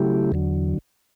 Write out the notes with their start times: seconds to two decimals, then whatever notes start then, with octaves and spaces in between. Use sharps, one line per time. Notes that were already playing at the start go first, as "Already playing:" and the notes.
Already playing: C#3 F#3 A3 E4 G4
0.32 E2 D3 F#3